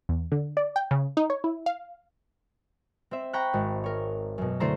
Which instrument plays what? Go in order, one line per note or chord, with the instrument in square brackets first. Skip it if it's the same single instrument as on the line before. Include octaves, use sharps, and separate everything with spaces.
[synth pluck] E2
D3
D5
G5
C#3
D#4
C#5
E4
F5
[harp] C4 C5 E5
G5 A#5 B5 C#6 F#6
G#1
A#4 C#5
F#2 B2
D3 A3 E4 C5 A#5